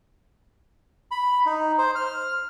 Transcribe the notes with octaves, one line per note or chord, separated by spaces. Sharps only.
B5
D#4
C5
F6